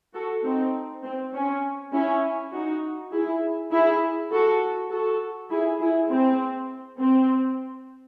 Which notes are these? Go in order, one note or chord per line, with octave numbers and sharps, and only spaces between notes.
F#4 A4
C4 D#4
C4
C#4
C#4 E4
D#4 F#4
E4 G#4
E4 G#4
F#4 A4
F#4 A4
E4 G#4
E4 G#4
C4
C4